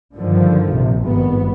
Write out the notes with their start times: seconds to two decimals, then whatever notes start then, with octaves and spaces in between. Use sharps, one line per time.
0.15 G2 D3 D#3 F3
0.72 A#1 C3
1.02 G#1 G2 B3